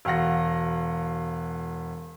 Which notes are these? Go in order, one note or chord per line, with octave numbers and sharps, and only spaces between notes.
E1 F5 F#5 A#6